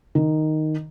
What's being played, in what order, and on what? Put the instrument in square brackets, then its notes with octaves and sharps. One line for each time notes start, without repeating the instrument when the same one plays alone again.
[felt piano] D#3